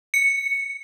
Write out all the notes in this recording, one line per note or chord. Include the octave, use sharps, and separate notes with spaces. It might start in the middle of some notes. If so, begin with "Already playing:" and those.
C#7